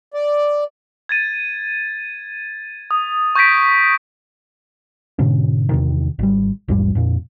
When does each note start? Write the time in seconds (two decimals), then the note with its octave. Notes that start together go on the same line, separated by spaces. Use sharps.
0.14 D5
1.09 G#6 A6 D#7
2.91 D#6
3.35 C#6 G6 G#6 A#6 B6 D7
5.19 G#2 B2 D3 C#4
5.69 E2 C3 D#3
6.19 G#1 G3
6.68 A#1 E2 G#2 G3
6.95 F2 A#2